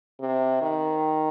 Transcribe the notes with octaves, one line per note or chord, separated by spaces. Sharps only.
C3
D#3